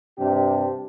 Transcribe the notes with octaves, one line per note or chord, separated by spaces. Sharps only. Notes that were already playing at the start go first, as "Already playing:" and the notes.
G2 C3 D4 G4